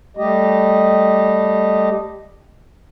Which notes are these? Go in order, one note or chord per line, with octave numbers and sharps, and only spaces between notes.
G3 A3 G4 D#5